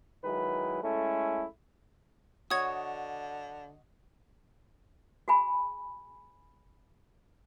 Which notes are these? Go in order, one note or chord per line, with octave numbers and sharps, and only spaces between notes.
D#3 F#3 G#3 E4 B4
G#3 A3 C#4 E4 A4
D3 F#4 C#5 D#5 D#6 G#6
F#4 G#4 G#5 B5